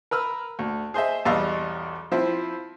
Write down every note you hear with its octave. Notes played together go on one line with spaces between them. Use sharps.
A#4 B4 E6 F6
D2
G#4 C5 D#5 E5
B1 E2 G3 D#5 F5 E6
F3 C4 E4